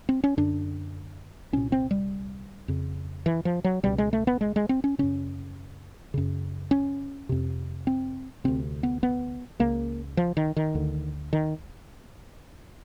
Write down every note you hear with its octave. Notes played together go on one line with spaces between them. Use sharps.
C4
C#4
F#2 D3 D4
C2 A#2 C#4
C4
G3
F2 C#3
E3
F3
F#3
C#2 B2 G3
G#3
A3
B3
G#3
G#3
C4
C#4
F#2 C#3 C#4
F#2 C#3
C#4
F2 C3
C4
D2 C3 C4
B3
B3
C#2 C#3 A#3
F3
D#3
D#3
D2 D3
D#3